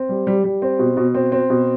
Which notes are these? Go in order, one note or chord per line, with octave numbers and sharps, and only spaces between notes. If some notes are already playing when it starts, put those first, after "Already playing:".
Already playing: C4
G3
G3
G3
C4
B2
B2
C4
C4
B2